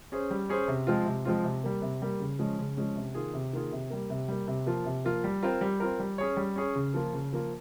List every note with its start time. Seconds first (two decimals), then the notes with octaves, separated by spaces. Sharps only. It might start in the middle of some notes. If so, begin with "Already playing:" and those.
0.12 C#4 G#4 C5
0.31 G3
0.49 C#4 G#4 C5
0.68 C3
0.87 F3 G#3 C4 F4
1.06 C3
1.25 F3 G#3 C4 F4
1.44 C3
1.64 G3 A#3
1.82 C3
2.02 G3 A#3
2.20 C#3
2.39 F3 G#3 C#4
2.58 C#3
2.77 F3 G#3 C#4
2.96 C3
3.14 D#3 A#3 F4 G#4
3.34 C3
3.53 D#3 A#3 F4 G#4
3.72 C3
3.90 G3 A#3
4.10 C3
4.28 G3 A#3
4.48 C3
4.66 F3 A#3 F4
4.85 C3
5.05 F3 A#3 F4
5.24 G3
5.43 C4 F4 A#4
5.61 G3
5.80 C4 F4 A#4
5.99 G3
6.18 C#4 G#4 C#5
6.37 G3
6.56 C#4 G#4 C#5
6.75 C#3
6.94 F3 A#3 F4
7.13 C#3
7.33 F3 A#3 F4